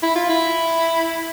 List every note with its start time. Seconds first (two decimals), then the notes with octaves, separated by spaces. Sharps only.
0.03 E4
0.16 F4
0.30 E4